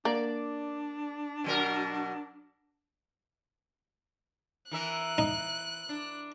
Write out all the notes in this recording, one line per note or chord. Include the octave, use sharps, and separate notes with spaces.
A#3 D4 D5
B2 F#3 A#4
E3 A#4 E5 F#6
D#4
D4